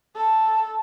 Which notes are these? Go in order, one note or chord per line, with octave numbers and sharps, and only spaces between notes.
A4